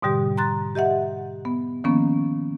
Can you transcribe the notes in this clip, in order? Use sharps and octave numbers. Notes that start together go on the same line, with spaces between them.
G#2 B2 D3 G3 G4
A#5 C6 F#6 A6
G4 D#5 E5 F#5
B3
D#3 F3 A#3 B3 C#4